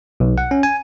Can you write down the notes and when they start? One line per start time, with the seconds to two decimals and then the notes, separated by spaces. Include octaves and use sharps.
0.20 B1
0.38 F#5
0.51 C#4
0.63 G#5